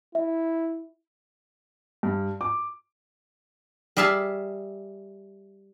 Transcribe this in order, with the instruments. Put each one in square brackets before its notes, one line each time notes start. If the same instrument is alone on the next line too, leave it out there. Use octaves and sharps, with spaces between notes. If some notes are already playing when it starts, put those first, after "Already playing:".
[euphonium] E4 [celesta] E5
[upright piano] G2
D6
[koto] G3 G#4 E5 F5 A5